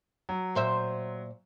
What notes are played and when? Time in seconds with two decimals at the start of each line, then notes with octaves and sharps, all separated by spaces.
0.29 F#3
0.55 A#2 C5 E5